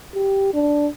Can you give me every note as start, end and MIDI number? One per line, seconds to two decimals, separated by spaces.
0.14 0.53 67
0.53 0.88 62